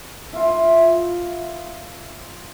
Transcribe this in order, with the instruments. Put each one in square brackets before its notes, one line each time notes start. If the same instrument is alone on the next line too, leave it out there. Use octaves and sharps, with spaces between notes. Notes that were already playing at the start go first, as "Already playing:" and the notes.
[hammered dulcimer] E4 F4